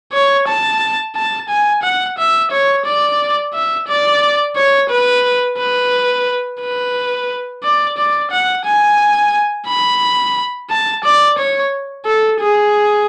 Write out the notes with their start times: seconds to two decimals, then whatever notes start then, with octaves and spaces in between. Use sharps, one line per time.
0.13 C#5
0.47 A5
1.16 A5
1.49 G#5
1.83 F#5
2.18 E5
2.51 C#5
2.85 D5
3.53 E5
3.88 D5
4.56 C#5
4.89 B4
5.58 B4
6.61 B4
7.63 D5
7.97 D5
8.31 F#5
8.65 G#5
9.68 B5
10.70 A5
11.04 D5
11.38 C#5
12.06 A4
12.40 G#4